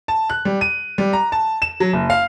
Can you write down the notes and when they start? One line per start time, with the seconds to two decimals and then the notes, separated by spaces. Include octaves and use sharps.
0.08 A5
0.30 F#6
0.45 G3
0.61 D#7
0.98 G3
1.13 A#5
1.32 A5
1.62 E7
1.80 F#3
1.93 F#1
2.10 F5